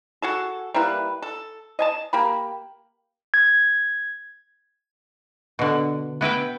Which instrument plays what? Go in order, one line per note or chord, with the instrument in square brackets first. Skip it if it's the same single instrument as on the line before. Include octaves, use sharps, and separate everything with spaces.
[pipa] F#4 G#4 A4
G3 A#3 E4 B4
A4
D#5 G#5 A5
A#3 G4 B5
[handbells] G#6
[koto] B2 D3
B3 E4 B4 G5